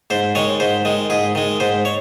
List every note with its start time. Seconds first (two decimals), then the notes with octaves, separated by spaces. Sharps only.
0.10 G#2 C5
0.35 D#3 G#3 C#5
0.60 G#2 C5
0.85 D#3 G#3
1.10 G#2 G#4
1.35 D#3 G#3
1.60 G#2 C5
1.85 C#5